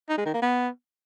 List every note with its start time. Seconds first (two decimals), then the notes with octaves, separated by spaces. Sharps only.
0.10 D#4
0.18 G#3
0.26 D#3
0.34 A#3
0.42 B3